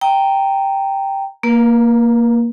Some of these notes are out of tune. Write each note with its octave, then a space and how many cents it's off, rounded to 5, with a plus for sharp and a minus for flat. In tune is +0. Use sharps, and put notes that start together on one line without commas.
G5 +0 A#5 -10
A#3 +0 B4 -45